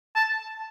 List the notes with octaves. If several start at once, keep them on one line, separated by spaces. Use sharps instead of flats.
A5